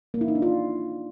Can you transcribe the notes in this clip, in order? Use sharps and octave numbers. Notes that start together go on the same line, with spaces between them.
A#3
E4
D#4
D4
F4